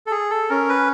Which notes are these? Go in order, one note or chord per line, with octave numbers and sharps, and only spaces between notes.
A4
G#4
A4
C#4 A#4
B4